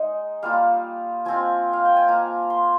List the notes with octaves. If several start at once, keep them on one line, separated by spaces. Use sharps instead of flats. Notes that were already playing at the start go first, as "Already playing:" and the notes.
Already playing: G#3 D#4 D#5
G3 A#3 F4 F5
F3 C4 F4 G#5
F5
G5
G#5
A#3 F4 A#5
C6